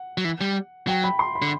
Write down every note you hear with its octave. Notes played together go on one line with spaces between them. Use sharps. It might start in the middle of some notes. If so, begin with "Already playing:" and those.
Already playing: F#5
F#3
E3
G3
F#3 G5
B5
C6
B5
D3